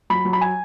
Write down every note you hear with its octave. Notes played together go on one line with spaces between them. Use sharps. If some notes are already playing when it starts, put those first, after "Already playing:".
F#3 B5
F#3
B5
G#5